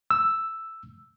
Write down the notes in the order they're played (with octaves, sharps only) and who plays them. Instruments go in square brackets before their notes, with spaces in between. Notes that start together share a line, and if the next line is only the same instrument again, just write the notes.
[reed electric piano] E6